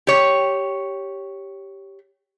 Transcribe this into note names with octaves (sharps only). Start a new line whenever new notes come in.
G4 C#5